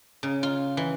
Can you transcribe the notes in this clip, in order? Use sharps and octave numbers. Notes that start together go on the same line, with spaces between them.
C#3
F4
E3